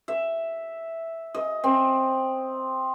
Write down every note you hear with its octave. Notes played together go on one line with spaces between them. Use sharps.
E5
D#5
C4